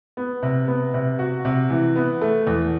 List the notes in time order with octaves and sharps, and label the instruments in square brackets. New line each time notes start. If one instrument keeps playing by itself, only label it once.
[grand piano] B3
C3
B3
C3
F#4
C3
E3
B3
A3
E2